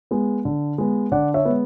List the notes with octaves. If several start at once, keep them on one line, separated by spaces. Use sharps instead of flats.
G#3 B3
D3
G#3 B3
D3 D5 F#5
C#5 E5
G#3 B3